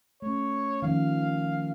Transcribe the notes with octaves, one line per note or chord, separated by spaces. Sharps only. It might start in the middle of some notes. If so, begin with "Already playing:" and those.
A3 C#4 C#5
D#3 F3 C#4 F5